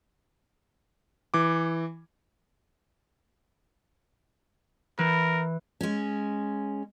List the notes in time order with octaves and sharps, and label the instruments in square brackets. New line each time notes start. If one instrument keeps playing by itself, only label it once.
[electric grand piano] E3 D6
[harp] E3 [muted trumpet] A#4
[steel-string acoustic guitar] G#3 C#4